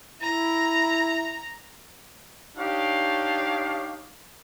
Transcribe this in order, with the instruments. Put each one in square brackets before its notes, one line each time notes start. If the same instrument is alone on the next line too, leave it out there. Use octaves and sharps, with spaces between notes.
[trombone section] E4 [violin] A#5
[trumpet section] D4 D#4 G4 C#5 F5